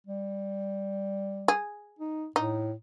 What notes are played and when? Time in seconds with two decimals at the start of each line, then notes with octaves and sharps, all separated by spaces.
0.07 G3
1.48 G#4
1.99 D#4
2.36 A2 D#4